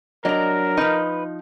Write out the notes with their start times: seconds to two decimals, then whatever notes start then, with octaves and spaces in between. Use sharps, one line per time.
0.25 F#3 D4 A#4 D#5 A#5
0.77 F3 D#4 B4